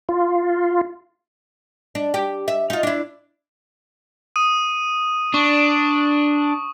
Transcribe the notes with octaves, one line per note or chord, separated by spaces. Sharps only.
F4
D4
G4
E5
D#4 F4
D4 E4
D#6 D#7
D4 C#6